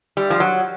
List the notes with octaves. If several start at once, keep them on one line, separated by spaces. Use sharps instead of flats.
G3
F3
F#3